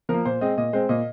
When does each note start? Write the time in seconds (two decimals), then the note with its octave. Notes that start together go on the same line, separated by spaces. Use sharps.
0.09 F3 A#4
0.14 A#3
0.25 A#2 C5
0.41 G#3 C4 D#5
0.57 A#2 D#5
0.73 G#3 C4 C5
0.89 A#2 D#5